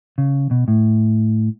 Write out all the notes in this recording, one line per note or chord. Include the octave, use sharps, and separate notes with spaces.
C#3
B2
A2